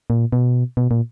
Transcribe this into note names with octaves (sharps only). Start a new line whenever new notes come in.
A#2
B2
B2
A#2